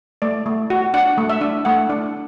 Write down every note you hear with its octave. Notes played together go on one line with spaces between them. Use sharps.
A3 D5
A3
F#4
D4 F#5
A3
E5
D4
A3 F#5
D4